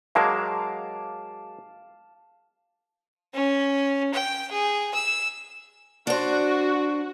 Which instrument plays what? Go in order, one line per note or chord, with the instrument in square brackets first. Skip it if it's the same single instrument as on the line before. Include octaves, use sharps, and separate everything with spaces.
[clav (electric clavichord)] F#3 G#3 A#3 [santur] F5 A5 D6
[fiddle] C#4
G5
G#4
E6
[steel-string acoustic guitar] D4 C5 [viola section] F#4